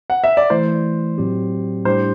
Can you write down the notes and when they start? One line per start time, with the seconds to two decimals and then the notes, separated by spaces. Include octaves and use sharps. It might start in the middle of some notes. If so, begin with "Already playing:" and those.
0.10 F#5
0.24 E5
0.37 D5
0.50 E3 A3 E4 C5
1.18 A2 F#3 C4 G4
1.85 A2 G3 D4 G4 C5